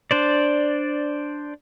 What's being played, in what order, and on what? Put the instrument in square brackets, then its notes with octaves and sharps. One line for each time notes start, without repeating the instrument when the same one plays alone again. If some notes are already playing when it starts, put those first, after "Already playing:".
[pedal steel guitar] D4 C5 D5